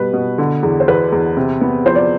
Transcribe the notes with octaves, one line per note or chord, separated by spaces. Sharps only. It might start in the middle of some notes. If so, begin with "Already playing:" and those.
Already playing: B2 G3 B3 B4
B2
D3
E2
C5
E2 B4
E2
C3
B3
F3 C5
D5